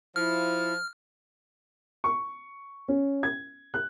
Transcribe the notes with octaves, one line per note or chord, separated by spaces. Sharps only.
F3 E4 F6
C#6
C#4
G#6
F#6